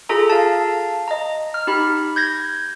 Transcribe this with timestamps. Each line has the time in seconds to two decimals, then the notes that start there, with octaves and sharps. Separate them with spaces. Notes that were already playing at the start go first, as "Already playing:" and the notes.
0.09 F4 G#4 A4 A#5
0.30 F5 A5
1.08 D#5 A#5
1.54 F6
1.67 D#4 G4 B5
2.16 G6 G#6 A#6